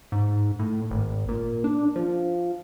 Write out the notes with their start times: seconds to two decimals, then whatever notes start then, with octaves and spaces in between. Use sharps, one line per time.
0.12 G#2
0.59 A2
0.91 G#1
1.29 A#2
1.64 D4
1.96 F3